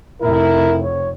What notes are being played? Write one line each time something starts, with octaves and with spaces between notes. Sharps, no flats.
F1 F2 E4 A#4
C#5